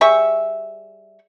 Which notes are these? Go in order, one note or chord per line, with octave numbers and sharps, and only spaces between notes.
G3 G#4 E5 C#6